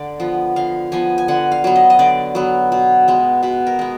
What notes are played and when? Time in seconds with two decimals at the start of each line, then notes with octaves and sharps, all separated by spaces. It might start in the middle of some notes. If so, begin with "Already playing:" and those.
Already playing: D3 D5
0.20 F3 B3
0.56 D3 F5
0.92 F3 B3 G#5
1.18 G#5
1.28 D3 F#5
1.52 F5
1.64 F#3 B3
1.76 D#5
1.90 D#5
1.99 D3 D5
2.35 F#3 B3
2.72 B2
3.08 G#3 B3
3.43 B2 B4
3.67 A#4
3.79 G#3 B3